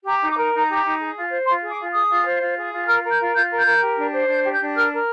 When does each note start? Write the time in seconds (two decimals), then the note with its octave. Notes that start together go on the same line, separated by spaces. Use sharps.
0.05 G4 A#5
0.21 D#4
0.29 D6
0.37 A#4
0.52 D#4 A#5
0.69 G4
0.83 D#4
1.00 G#4
1.16 F4
1.30 C5
1.46 F4 C6
1.62 G#4
1.70 D6
1.78 F4
1.93 G#4 D#6
2.09 F4
2.25 C5
2.40 F4
2.56 G#4
2.72 F4
2.87 A#4 F6
3.02 A#4
3.10 G6
3.19 F4
3.34 F4 G6
3.50 A#4
3.58 G6
3.65 A#4
3.81 G4
3.97 D4
4.13 C5
4.28 D4 G6
4.44 G4
4.51 G6
4.59 D4
4.75 A#4 F6
4.91 A#4